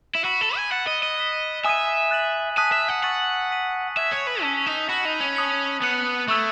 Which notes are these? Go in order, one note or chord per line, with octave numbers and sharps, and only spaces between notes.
E4
F#4 B5 E6 B6 D#7 F#7
A4
G#5
F#5 F#6 A6 C#7 E7
D#5
D#5
F#6 B6 E7
E5 G#5 D#6 G#6 D#7
F#6 A6 D#7 F#7
G#5 A5 D#6 F#6 B6
E5
F#5
F#5 C#6 E6 A6 D#7 F#7
F#6 B6 D#7 F#7
E5 E6 G#6 B6 E7
C#5
B4
C#4 A5 E6 B6
D#4
F#4 B5 F#6 B6 F#7
D#4
C#4
A5 D#6 F#6 C#7 F#7
B3 F#6 C#7 F#7
A3 C#6 E6 G#6